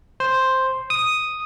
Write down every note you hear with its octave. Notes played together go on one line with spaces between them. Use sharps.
C5
D#6